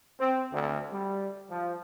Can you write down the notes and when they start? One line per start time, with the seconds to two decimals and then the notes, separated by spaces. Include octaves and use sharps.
0.19 C4
0.52 D2
0.91 G3
1.50 F3